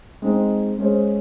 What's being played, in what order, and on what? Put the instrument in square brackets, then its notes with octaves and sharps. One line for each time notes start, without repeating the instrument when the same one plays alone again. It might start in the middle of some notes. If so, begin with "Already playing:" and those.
[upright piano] G#3 C4 D#4
G#3 C#4 G#4 C5